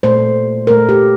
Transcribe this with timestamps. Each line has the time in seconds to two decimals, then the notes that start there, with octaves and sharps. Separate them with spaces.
0.03 A#2 A3 C5
0.67 A#2 A3 A#4
0.89 G4